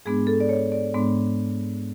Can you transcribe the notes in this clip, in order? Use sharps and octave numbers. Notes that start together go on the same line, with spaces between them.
G#2 G#3 B3 D4 G#4
A4
D5
C#5
D5
G#2 G#3 B3 D4